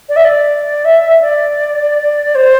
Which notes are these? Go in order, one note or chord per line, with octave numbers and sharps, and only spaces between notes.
D5
E5
D5
E5
D5
C5